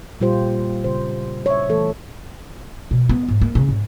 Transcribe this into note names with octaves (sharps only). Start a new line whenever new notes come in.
A#2 G3 F4 G4 C5
C#3 C5
C#5 E5
E3 A3 A4
B2
B3
G#2
A#3
C#3
G#2